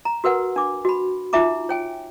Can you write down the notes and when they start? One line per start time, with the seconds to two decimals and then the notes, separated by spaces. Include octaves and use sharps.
0.05 A#5
0.24 F#4 A#4 B4 F#5
0.56 D4 D6
0.85 F#4 B5
1.33 D#4 F4 E5 A#5 D6
1.69 C#5 G5 G#5